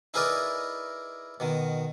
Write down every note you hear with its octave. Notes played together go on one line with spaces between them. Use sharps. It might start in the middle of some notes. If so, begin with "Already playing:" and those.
D#4 E4 G#4 A#4 B4 D5
B2 D#3